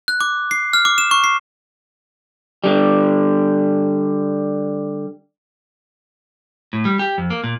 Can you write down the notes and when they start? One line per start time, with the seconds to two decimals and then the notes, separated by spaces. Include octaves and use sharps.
0.08 F#6
0.21 D6
0.51 C7
0.73 F6
0.85 D6
0.98 E7
1.11 C#6
1.24 C7
2.64 D3 G3
6.73 A2
6.85 G3
6.99 G4
7.18 F2
7.30 A#3
7.44 A#2